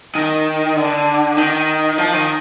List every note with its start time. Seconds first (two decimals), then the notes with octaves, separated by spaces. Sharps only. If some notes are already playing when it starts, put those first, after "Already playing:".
0.15 D#3
0.76 D3
1.37 D#3
1.98 F3
2.13 D#3